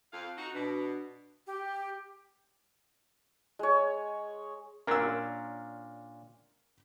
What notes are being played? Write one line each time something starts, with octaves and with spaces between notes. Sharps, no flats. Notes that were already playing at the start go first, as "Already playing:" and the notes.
F2 F5
D#4 F#4
B2 D4
G4
G#3 C#5
A#2 C#4 D4 A#4 E6